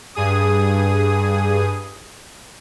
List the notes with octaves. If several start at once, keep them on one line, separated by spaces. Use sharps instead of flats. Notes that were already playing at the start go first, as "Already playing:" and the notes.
G2 G#4 D#6